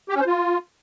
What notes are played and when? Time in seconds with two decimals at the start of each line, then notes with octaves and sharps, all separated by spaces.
0.09 G4
0.15 C#4
0.21 C5
0.26 F4